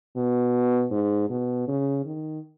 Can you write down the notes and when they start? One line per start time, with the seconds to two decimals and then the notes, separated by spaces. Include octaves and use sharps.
0.16 B2
0.91 G#2
1.30 B2
1.68 C#3
2.05 D#3